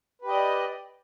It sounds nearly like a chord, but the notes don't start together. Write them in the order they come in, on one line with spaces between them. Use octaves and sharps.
B4 G4 D#5 D5